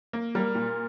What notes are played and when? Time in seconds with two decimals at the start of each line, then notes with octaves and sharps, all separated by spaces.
0.13 A#3
0.35 G3 A#4
0.55 A#2